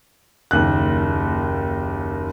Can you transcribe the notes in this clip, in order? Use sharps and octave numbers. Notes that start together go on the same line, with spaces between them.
F#1 D#2 F#6